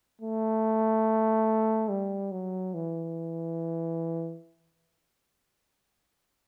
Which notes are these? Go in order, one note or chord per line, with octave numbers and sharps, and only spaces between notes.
A3
G3
F#3
E3